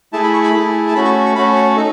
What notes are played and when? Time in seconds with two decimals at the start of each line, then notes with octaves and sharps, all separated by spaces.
0.13 A3 E4 G#4 A5
0.24 B5
0.33 C#6
0.44 B5
0.54 A3 E4 G#4
0.88 A5
0.94 A3 C#4 F#4 B5
1.05 C#6
1.26 C#6
1.35 A3 C#4 F#4 B5
1.55 C#5
1.76 D#4 A4